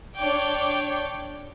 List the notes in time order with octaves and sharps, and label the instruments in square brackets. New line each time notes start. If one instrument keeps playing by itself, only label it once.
[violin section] D4 C#5 D5 G5